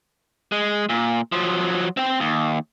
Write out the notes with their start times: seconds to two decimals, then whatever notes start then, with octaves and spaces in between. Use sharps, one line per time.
0.52 G#3
0.89 A#2
1.32 F3 F#3
1.97 C4 G5
2.20 D#2